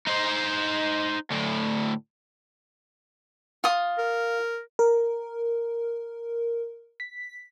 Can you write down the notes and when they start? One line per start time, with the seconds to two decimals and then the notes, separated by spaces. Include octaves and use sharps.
0.07 D#4 C5
1.30 D2 A2
3.64 F4 D#6
3.98 A#4
4.79 A#4
7.00 B6